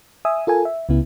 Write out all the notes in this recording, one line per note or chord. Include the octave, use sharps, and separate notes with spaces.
E5 G#5 D#6 E6
F4 A4 A#4 G#5
E5
C#2 C#3 B3 E4